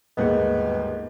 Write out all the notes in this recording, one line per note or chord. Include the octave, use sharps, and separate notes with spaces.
G1 D#2 G#2 B3 G#4 D#5